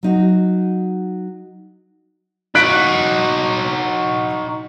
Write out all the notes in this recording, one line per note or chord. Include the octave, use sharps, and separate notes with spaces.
F#3 D#4 F#4
D#4 F#4 F#6 B6 D7